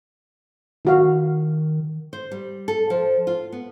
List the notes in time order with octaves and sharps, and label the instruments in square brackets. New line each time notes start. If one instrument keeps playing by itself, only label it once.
[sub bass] D#3 [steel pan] E4 F#4 F5
[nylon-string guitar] C5
G3
A4
F3
F4
B3